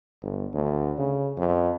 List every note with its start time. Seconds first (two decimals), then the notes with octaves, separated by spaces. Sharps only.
0.22 G1
0.54 D2
0.98 C#3
1.37 F2